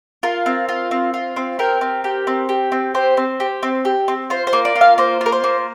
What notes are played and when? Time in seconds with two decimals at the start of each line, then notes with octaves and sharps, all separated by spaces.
0.23 F4 A#4
0.46 C4
0.69 F4
0.91 C4
1.14 F4
1.36 C4
1.59 G4 A#4
1.81 C4
2.04 G4
2.27 C4
2.49 G4
2.72 C4
2.94 G4 C5
3.17 C4
3.40 G4
3.63 C4
3.85 G4
4.08 C4
4.30 F4 C5
4.47 C5
4.53 A#3
4.65 D5
4.75 F4
4.81 F5
4.98 A#3 C5
5.21 F4
5.26 A#4
5.32 C5
5.44 A#3